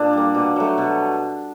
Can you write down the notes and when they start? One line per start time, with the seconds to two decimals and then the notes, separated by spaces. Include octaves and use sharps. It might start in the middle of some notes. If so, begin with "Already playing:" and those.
Already playing: A#2 D4
0.13 G3 A#3
0.34 B2
0.56 F#3 A3
0.78 B2